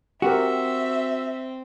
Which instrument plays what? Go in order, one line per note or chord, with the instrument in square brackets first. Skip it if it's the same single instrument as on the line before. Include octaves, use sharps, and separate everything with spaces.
[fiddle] C4 [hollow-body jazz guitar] F#4 [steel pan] G4 A#4 [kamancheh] E5